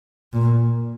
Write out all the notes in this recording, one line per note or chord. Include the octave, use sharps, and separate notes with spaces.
A#2